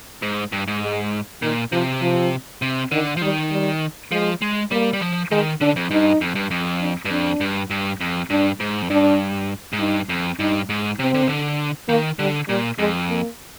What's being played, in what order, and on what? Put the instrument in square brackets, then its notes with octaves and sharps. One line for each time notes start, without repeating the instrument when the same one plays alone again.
[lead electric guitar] G#2
G2
G#2
[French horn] G#3
[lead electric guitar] A#2 [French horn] D#3
[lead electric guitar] C3 [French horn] F3
[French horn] F3
[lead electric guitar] C3
[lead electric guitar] D3 [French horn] D#3
[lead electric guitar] F3
[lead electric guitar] D#3 [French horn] G3
[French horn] G3
[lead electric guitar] F3 [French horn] G#3
[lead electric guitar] G#3
[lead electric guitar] G3 [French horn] A#3
[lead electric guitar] G3
F3
[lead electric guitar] D#3 [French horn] G#3
[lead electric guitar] D3 [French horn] D4
[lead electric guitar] F2
[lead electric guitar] G2 [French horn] D#4
[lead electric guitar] F2
G2
F2
[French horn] D4
[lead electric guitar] G2
[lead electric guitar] F2 [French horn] D4
[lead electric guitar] G2
G2
F2
[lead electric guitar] G2 [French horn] D4
[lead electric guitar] G#2
F2
[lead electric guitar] G2 [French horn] D4
[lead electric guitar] G#2
[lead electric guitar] G2 [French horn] D#4
[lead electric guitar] F2
[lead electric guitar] G2 [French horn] D#4
[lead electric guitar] G#2
[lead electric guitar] C3 [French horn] C4
[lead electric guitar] D3
C3
D3
[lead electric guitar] D#3 [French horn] A#3
[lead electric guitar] D3 [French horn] G3
[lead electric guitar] A#2 [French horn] G3
[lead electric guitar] F2 [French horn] G#3
[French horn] A#3